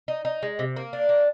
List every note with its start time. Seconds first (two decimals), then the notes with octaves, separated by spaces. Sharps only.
0.08 D#4
0.25 D#4
0.43 G#3
0.59 C3
0.76 A#3
0.93 D4
1.09 A#3